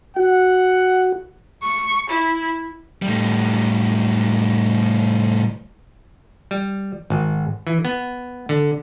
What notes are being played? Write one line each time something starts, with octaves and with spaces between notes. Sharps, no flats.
F#4 F#5
C#6
E4
A2 G3
G3
G#1
E3
B3
D3